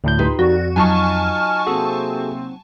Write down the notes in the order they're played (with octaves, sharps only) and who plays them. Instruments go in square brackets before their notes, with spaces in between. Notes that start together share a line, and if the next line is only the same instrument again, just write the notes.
[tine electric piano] D2 A2 G6
[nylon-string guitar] D#4 G4 B4 [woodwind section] F4 C6
[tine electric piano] F2 [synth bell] F#4 [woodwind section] A4 D5
[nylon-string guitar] F#3 D#4 F4 [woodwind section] D#5 F6 [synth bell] G#5 A5 C#6
[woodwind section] C3 A#3 C4 [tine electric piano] F#4 G#4 A4